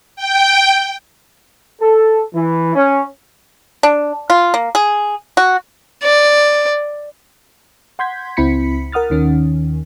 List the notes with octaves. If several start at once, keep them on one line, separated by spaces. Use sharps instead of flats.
G5
A4
E3
C#4
D4
F4
A#3
G#4
F#4
D5
F#5 C6 G6 G#6 B6
C#2 C4 E4 B5 B6 C#7
A#4 F#5 D#6 F6 A6
D#2 D#3 C#4